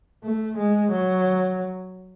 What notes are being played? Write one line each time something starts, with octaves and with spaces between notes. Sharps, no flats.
A3
G#3
F#3